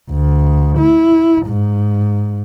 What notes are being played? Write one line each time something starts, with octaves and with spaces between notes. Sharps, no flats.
D2
E4
G#2